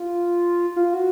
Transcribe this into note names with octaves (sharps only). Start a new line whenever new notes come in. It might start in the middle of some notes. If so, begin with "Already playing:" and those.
Already playing: F4
F4
F#4